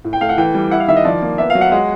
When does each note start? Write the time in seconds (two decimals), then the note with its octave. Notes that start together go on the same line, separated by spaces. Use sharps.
0.05 A2
0.13 G5
0.21 A3 F5
0.29 F#5
0.38 E3 G5
0.55 G3
0.71 E4 F#5
0.80 F5
0.88 D#3 E5
0.96 D#5
1.05 F3 D5
1.22 A#3
1.38 B3 E5
1.50 F5
1.55 F#3
1.61 F#5
1.72 G#3 F#5